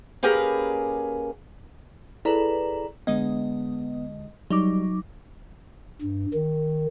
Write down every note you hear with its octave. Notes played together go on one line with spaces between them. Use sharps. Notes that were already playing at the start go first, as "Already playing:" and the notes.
A#3 C#4 G4 G#4 A#4 B4
E4 G#4 A4 B4 D5 A#5
D3 G#3 B3 D#5
F#3 G3 D#4 D6
G2
D#3